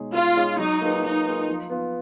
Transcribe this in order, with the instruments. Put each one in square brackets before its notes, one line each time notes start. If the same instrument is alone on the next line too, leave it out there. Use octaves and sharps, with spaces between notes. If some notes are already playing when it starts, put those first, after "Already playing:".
Already playing: [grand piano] B2 G#3 D#4 G#4 C#5
[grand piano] B2 [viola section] F4
[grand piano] G#3 D#4 G#4 C#5
[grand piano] F#3 [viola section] D#4
[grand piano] A#3 F4 G#4 B4
[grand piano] F#3 [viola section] D#4
[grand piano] A#3 F4 G#4 B4
F3
B3 F4 B4